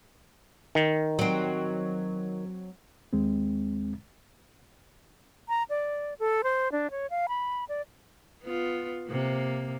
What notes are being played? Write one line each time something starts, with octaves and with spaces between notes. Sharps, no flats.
D#3
F#3 C4
D#2 G#3 C4
A#5
D5
A4
C5
D4
C#5
F5
B5
D5
B3 F4
C3 A#3